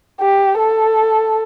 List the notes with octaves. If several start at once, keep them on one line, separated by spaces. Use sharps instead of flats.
G4
A4